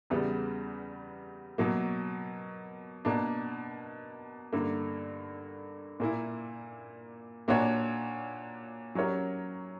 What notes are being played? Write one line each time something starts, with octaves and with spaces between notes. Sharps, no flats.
E2 C#3 G3 B3 F#4
B2 F#3 A#3
B2 A#3 D4
G2 D3 A#3
A#2 A#3 E4
A#2 A#3 D4 F#4 C#5
F#3 C#4 G4 A#4 C#5